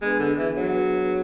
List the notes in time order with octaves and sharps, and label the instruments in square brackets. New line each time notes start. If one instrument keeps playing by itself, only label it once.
[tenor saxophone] G#3 [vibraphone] B3 D4 G#4 B4
[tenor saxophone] D3
E3
F#3